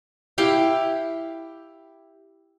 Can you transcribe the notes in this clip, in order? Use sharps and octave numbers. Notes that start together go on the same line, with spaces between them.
E4 G4 F5 G5